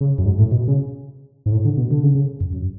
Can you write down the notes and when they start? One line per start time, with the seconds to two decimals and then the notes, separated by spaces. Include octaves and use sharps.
0.01 C#3
0.18 F#2
0.26 G#2
0.39 A2
0.51 B2
0.68 C#3
1.46 G#2
1.52 A2
1.65 D3
1.77 B2
1.91 D3
2.03 C#3
2.15 C#3
2.40 F#2
2.53 F#2